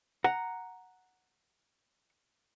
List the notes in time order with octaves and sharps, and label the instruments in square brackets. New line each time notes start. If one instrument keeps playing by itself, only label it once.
[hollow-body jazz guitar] F#5 A#5